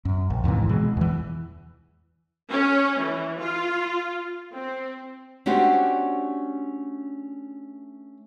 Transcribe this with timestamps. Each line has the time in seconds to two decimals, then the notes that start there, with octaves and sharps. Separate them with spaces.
0.05 F#2
0.30 A#1
0.44 D#2 G#2 C3 E3
0.69 B2 E3 G#3
0.97 E2 E3
2.51 C#4
2.99 E3
3.38 F4
4.53 C4
5.46 A3 C#4 D4 F#4 G4 C5